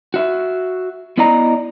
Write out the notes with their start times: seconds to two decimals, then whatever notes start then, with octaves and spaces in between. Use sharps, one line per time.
0.14 F#4 E5
1.18 B3 E4 D5 D#5 A#5